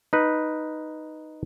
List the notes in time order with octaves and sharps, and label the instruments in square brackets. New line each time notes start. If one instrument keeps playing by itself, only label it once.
[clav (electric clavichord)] D#4 B4